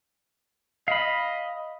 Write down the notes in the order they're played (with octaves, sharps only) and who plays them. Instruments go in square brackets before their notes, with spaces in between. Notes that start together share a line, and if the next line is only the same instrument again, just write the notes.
[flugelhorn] D#5 [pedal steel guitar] F5 B5